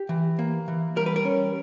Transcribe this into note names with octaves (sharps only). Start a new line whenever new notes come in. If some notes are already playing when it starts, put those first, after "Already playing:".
Already playing: G4
E3
A#3
E3
G3 A#4
B4
A#4
C#4